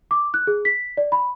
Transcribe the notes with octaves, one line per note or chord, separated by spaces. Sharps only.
D6
F#6
G#4
B6
D5
B5